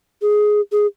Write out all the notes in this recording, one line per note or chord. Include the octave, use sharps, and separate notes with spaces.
G#4
G#4